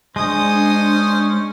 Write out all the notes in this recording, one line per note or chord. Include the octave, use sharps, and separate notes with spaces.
G#3 C#4 D4 C5 D#5 D#6